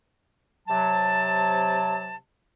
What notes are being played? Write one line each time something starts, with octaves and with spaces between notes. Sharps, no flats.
C3 F#3 A5